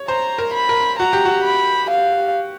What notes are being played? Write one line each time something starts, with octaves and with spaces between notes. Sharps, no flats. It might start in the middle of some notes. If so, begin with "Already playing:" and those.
Already playing: C#5
C5 A#5
A#4
B5
A#4
F#4 A#5
G4
F#4
B5
F5